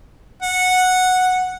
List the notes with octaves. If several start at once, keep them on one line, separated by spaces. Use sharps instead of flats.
F#5